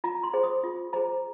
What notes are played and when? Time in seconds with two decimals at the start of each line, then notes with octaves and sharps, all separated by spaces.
0.04 F4 A#5
0.23 C6
0.33 G#4 C5
0.43 D#6
0.64 F4
0.93 G#4 C5 A#5